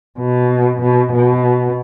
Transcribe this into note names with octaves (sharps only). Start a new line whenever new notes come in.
B2
B2
B2